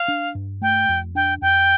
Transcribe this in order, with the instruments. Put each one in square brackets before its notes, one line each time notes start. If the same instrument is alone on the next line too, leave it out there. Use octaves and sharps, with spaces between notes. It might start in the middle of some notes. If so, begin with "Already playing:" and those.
Already playing: [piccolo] F5
[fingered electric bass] D4
G2
[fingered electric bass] A3 [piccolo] G5
[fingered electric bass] F2
[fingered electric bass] D4 [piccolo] G5
[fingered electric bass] F2 [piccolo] G5